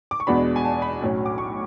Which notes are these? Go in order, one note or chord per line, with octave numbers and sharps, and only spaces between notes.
D6
C#6
E2 B2 G#3 B3 D4 B5
G#5
A5
B5
B1 A2 F#3 C#4
D6
C#6